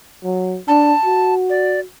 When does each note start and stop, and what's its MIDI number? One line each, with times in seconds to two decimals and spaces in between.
0.24 0.58 54
0.68 0.93 62
0.68 1.34 81
1.05 1.85 66
1.50 1.80 74